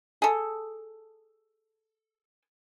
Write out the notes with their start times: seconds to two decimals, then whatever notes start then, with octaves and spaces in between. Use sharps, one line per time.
0.22 G#4 A4